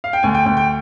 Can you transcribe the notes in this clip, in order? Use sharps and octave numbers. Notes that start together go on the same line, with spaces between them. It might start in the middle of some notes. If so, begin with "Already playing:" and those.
F5
G5
D2 G#5
G5
D2 G5
G5